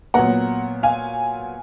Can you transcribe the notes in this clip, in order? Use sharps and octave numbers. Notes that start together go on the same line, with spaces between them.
A#2 F#3 B3 F#5 A#5
F5 G#5